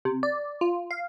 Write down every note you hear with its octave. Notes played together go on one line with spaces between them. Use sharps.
C3
D5
F4
F5